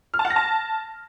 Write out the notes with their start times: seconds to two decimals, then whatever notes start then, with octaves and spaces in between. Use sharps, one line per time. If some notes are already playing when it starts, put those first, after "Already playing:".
0.14 F6
0.19 A5
0.25 F#5
0.30 A#6
0.36 A5